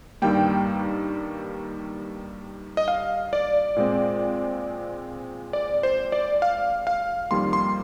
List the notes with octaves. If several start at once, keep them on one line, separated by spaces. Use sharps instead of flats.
G2 D#3 G3 A#3 G5
D#5
F5
D5
A#2 G#3 C4
D5
C5
D5
F5
F5
F2 D#3 G3 A#3 C6
C6